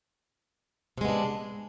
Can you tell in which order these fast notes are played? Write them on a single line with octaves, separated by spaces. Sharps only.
C3 G#3 B3 D4